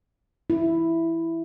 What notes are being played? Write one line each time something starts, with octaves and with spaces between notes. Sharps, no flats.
E4